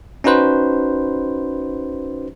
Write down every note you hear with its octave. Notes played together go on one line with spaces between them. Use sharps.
C#4 D#4 F#4 B4 C5